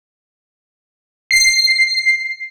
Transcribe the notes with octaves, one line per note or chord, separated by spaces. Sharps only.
C7